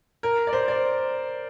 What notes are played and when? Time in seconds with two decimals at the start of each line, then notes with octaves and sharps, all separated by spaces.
0.23 A#4
0.47 D5
0.53 C5
0.68 D5